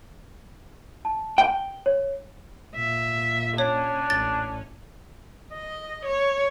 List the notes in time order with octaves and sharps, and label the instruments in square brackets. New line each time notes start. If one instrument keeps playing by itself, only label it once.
[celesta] A5
[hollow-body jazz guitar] G5
[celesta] C#5
[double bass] A#2 [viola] E5
[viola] C#4 [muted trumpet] D4 [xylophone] C#5
[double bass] A1 [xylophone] A6
[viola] D#5
C#5